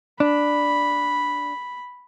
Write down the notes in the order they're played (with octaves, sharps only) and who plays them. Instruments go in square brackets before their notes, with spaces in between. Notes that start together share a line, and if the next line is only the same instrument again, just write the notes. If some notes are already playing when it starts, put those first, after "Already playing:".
[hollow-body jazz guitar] D4 [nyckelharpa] B5